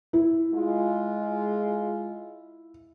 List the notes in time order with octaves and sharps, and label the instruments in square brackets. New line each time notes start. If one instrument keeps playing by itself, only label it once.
[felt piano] E4
[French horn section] G#3 F4